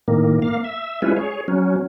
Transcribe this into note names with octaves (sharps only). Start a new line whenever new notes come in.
A2 D#3 A#3
A#3 F5
E5
G3 G#3 C#4 E4 F4 B4
G#4 C#5
F#3 C#4